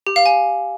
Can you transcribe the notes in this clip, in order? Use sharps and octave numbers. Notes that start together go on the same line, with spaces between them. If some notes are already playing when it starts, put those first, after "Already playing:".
G4
F5
G#5